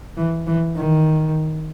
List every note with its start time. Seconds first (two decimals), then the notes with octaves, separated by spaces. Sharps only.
0.17 E3
0.47 E3
0.76 D#3